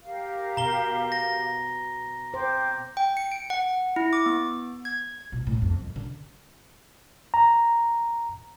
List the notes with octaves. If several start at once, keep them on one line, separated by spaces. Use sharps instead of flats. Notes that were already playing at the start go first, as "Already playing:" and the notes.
G4 A#4 F5
B2 A#5 G7
A#6
C5 G5 D6
G5
C#7
D7
F#5
E4
D6
B3
G#6
B2
A2
F2
F#2
D3
A#5